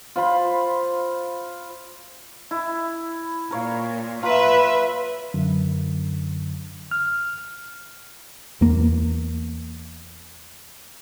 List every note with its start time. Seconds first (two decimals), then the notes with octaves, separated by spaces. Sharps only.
0.16 F4 C5 B5
2.51 E4
3.51 A#2 A#4 C#5 F5
4.23 F4 B4 E5 A#5
5.34 F#2 D3
6.91 F6
8.61 E2 A#3